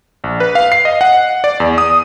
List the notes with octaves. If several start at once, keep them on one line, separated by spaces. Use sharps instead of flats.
A#1
B4
F5
C7
D#5
F#5
D5
E2
D#6